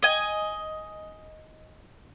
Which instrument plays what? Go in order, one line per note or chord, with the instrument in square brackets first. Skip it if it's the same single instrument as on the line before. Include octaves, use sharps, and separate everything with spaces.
[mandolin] D#5 G#5